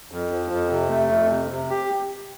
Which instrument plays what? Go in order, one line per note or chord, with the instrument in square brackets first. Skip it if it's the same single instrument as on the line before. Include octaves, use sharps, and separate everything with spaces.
[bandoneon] F2
F3
F2
C3
A3
F2
C3
C3
G4